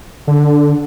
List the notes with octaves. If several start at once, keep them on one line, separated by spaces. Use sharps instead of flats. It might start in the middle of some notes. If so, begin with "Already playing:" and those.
D3